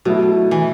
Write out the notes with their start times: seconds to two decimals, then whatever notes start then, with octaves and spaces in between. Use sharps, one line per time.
0.05 B2 F#3 A3 E4
0.51 E3